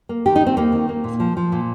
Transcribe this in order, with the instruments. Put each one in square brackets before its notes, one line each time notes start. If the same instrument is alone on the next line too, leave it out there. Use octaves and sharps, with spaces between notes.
[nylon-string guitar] A#3
D#3 G4
D#4
D#3
C4
D#2 A#3
D#3
A#3
A#2
F3
F3
A#2